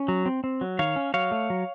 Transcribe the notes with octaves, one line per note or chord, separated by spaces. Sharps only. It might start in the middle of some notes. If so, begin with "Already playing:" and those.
Already playing: C#4
F#3
C4
C4
F#3
D#3 C#5 F5
C#4
F#3 C#5 F5
A3
F#3